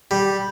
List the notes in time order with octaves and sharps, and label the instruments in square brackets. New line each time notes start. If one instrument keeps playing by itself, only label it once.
[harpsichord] G3